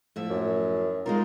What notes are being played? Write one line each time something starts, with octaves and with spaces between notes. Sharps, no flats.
A2 F3 E5
F#2
G#3 D#4 F4 A#4